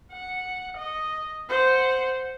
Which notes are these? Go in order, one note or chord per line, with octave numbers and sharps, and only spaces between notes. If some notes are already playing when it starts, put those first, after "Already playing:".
F#5
D#5
C5 F#5